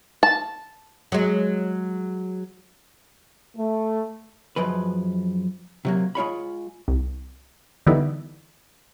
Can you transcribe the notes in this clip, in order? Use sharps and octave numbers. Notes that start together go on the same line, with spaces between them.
A5
F#3 G#3
A3
F#2 F3 G#3 B4
C3 F#3 A#3
G#3 F4 C#5 B5
C2
D3 E3 G3 B3 D#4 E4